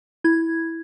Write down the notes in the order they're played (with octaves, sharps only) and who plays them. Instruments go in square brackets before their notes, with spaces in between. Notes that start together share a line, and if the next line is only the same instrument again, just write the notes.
[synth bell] E4 G#6